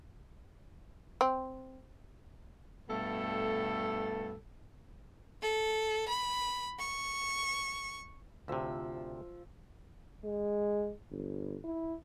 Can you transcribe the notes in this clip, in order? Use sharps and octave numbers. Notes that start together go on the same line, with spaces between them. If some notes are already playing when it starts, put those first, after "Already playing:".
C4
G2 B2 A3 A4
A4
B5
C#6
D2 A2 C3 F3 E6
G#3
G1
E4